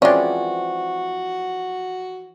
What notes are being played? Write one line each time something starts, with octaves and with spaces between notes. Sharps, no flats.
E3 F3 G#3 C4 C#4 F#4 D5